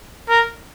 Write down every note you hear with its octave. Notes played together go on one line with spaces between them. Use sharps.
A#4